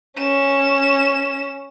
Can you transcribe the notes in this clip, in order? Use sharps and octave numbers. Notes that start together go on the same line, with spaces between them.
C#4 E7